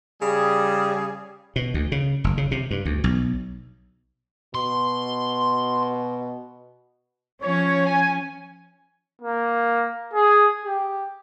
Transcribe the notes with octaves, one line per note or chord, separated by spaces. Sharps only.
C#3 G3 G#4
B2
D2
C#3
F#1
C#3
C3
G2
D2
B1
B2 C6
F3 C#4 C#5
G#5
A#3
G#4
G4